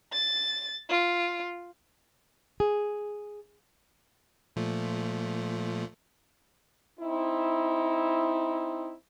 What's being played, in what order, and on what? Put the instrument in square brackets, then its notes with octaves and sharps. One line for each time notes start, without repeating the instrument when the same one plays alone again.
[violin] A6
F4
[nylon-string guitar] G#4
[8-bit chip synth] A#2 F3 A3
[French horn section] C4 D#4 E4